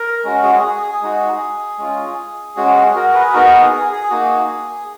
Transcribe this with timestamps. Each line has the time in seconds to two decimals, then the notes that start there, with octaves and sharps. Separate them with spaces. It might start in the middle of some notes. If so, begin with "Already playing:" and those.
Already playing: A#4
0.25 G#3 C#4 F#4
0.44 G#4
0.63 G#4
0.83 G#4
1.02 G#3 D#4 F#4
1.78 G#3 C#4 F4
2.56 G#3 C#4 F#4
2.75 G#4
2.95 F#4 A#4
3.14 G#4 B4
3.33 B3 D#4 F#4 A#4
3.53 G#4
3.72 G#4
3.92 G#4
4.10 A#3 D#4 F#4